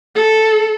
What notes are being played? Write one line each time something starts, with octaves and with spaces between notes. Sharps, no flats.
A4